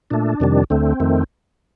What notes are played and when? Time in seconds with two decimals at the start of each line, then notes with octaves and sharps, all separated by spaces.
0.10 A#2 A3 D4
0.40 F2 C3 D#3 G3
0.70 D2 D3 A3 C4
1.00 F2 D#3 A3